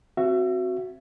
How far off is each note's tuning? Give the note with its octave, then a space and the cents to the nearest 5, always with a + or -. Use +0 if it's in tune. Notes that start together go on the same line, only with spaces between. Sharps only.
C4 +0 F#4 +0 E5 +30